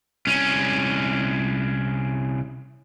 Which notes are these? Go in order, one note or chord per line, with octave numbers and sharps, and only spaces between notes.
C2 C#4